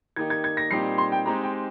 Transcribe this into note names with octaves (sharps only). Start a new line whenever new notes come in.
D#3 A#3 D#4 G4 G#6
G#6
G#6
A#6
A#2 G3 C4 D#4 G4 C7
C6
G5
G#3 C4 D#4 G4 A#5
G5